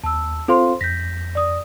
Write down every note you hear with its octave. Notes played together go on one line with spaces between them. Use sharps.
D#2 A5 E6
C4 F4 A4 C5 F5 C6
F2 G6 A#6 B6
D5 D#6